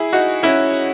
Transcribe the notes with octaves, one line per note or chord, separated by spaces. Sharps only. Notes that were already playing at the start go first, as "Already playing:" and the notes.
Already playing: E4 G#4
D#4 F#4
C#4 E4